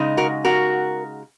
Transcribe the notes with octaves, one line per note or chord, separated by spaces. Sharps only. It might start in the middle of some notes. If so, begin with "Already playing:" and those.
Already playing: C#3 G#3 D#4
F#4 A#4
F#4 A#4